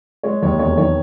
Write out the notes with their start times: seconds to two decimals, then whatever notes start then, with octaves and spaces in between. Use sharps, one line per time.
0.23 G#3 C#5
0.42 D#2 C#5
0.59 E1 C#5
0.77 D#3 C#5